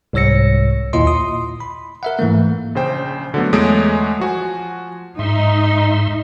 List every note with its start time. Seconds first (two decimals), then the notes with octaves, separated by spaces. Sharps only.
0.13 C2 G#2 C#5 E6 A#6 C#7
0.93 D#2 A#2 E4 F4 D#5 C6
1.07 C6 D#6
1.60 B5
2.03 A#4 E5 F#5
2.19 G#2 E3 A3 A#3
2.75 A#1 C#3 C5 G5
3.34 D3 F#3 A3 B3
3.53 E2 G#3 A3 C#5 D#6 D7
4.20 F3 F#4 G#5
5.19 G#2 D#4 E5 C6